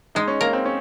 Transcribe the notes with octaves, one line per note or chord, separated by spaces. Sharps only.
G#3 D#4
C#4
A#3 A#4
C4
C#4